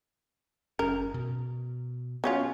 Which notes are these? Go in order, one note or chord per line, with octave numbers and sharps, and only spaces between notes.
F#1 C#4 A#4
B2
F#3 B3 C#4 F4